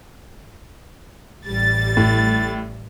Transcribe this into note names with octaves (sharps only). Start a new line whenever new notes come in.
A1 G3 A6
A2